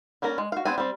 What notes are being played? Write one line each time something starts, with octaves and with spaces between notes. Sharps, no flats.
G3 A#3 C#4 A#4 A#5
G#3
F#4 F5
B3 C4 D4 G#5
G3 C4